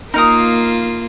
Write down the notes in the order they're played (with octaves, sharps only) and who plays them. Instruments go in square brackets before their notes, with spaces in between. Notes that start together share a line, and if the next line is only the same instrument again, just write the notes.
[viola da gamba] A#3 F4 [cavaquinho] D#4 A#4 D#6